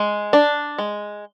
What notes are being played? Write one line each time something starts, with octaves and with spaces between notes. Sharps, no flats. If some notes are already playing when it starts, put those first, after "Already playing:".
Already playing: G#3
D4
G#3